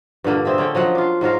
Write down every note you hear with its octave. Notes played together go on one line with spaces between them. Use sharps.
G2 A#2 D3 A#3
C4 G#4 E5
D3 C#4 G5
F3 F#3 D#5 F#5
D4 F4
G#2 F#3 F4 A#4